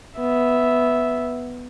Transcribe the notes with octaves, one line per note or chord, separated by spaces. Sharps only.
B3 E5